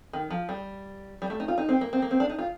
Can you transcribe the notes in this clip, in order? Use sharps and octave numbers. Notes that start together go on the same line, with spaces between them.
D#3
F3
G3
G3
A3
D#4
F4
D#4
C4
A#3
C4
A#3
C4
D4
D#4
F4